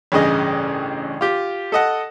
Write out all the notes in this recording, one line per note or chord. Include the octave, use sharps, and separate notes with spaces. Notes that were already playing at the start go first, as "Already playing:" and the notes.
A1 G2 C#3 D#5
F4 G4
A4 D#5 F#5